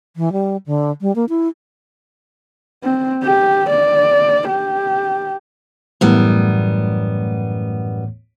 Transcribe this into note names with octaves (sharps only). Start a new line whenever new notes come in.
E3
G3
D3
G3
A#3
E4
C4
G4
D5
G4
F#2 A2 E3 G3 A3 B3